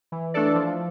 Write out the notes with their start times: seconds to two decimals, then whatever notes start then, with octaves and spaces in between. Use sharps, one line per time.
0.12 E3
0.34 A3 D4 A4 D5
0.55 F3